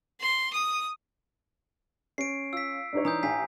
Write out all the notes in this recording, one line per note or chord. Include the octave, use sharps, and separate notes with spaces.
C6
D#6
C#4 C7 D7
F4 E6 B6
G2 D4 D#4 C#5 D5
E3 A#5 D#6 G6
A1 G4 G#5 B6 C7